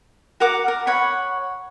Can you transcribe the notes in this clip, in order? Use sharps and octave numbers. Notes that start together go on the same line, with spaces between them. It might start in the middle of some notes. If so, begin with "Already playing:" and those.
F#4 A#4 F#5 D6
A#4
C#5 F#5 B5